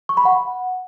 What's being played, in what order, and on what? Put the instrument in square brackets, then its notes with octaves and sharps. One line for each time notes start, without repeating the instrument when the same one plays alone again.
[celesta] C#6
B5
F#5